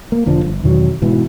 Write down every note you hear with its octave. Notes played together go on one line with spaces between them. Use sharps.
A#3
E1 D3 F3
G1
E2 B2 D#3 F#3
G#2 B2 E3